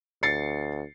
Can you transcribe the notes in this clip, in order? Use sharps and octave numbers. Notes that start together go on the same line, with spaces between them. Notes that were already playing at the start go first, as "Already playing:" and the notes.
D2 A6 C7 C#7